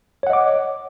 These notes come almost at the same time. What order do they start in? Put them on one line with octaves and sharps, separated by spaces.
C#5 F#5 D#5 D6